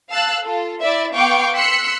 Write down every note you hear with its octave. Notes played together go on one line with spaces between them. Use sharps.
F5 A5 E6 F#6
F4 A4
E4 D5 E5
B3 F5 G5 C#6 D6 D7
C6 E6 F#6 B6 C#7